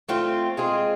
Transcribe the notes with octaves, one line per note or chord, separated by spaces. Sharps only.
A3 C4 F4
G#3 C4 F4 G#4